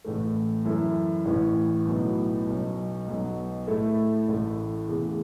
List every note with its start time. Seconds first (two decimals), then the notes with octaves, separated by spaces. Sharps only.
0.05 A1 A2 E3 A3
0.65 F#2 E3 C#4 E4 A4
1.25 A1 A2 E3 C#4
1.86 B1 A2 F#3 B3 F#4
2.47 B1 B2 F#3 C#4
3.07 B1 B2 F#3
3.68 A2 A3 E4 A4
4.28 A1 A2 A3
4.88 E2 C#3 A3